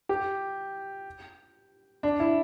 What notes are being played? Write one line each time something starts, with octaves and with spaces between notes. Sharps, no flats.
G4
D4
E4